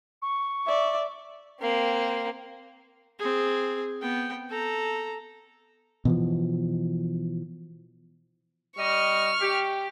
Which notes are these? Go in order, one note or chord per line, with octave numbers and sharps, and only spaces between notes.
C#6
D5 E5
A#3 C4
C4 G#4
B3 G5
A4 A#5
B2 E3 F3
G3 D#5 C#6 F6
G4